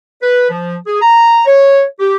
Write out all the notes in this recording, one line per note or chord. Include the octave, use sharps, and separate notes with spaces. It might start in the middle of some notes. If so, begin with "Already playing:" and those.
B4
F3
G#4
A#5
C#5
G4